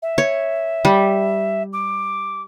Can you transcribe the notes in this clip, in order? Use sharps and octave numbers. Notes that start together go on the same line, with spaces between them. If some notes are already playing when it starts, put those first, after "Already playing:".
E5
C#5
G3
D6